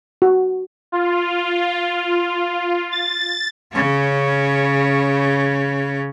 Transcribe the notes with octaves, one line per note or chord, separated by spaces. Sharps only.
F#4
F4
A6
C#3 C#4